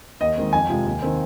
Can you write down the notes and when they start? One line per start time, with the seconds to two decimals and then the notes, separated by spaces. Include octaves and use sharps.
0.20 D#2 D#5
0.37 D#3 G#3 C4
0.53 F2 G#5
0.70 C3 F3 G#3
0.86 D#2
1.02 D#3 C4